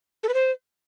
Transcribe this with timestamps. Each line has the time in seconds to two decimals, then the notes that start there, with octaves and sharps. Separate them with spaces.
0.23 A4
0.29 B4
0.34 C5